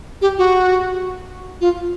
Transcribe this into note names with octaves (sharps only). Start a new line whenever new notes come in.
G4
F#4
F4